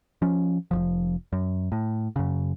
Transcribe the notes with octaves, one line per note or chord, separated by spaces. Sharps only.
F3 C#4
F1 B1 F3
F#2
A2
F#2 C#3